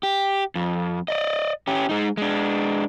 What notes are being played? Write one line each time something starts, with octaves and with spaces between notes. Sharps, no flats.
G4
F2
D5 D#5
C#4 G4
G#3 D#4
G#3 D4